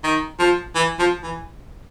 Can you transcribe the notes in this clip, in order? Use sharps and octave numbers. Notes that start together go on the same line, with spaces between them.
D#3
F3
E3
F3
E3